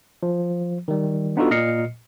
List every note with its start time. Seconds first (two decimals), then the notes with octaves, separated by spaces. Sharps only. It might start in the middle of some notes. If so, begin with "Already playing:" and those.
0.23 F3
0.88 D#3 G3
1.37 B3 D4 D#4 F4 F#4 A4
1.51 A#2 D#5 F6 C7 C#7